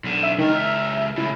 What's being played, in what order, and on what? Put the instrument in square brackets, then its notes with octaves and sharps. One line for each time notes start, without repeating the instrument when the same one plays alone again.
[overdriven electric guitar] B1 D3
[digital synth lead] E5
[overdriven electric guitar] C#2 A#4 [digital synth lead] D#3
[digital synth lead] E5
[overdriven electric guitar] A2 C#3 [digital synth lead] E4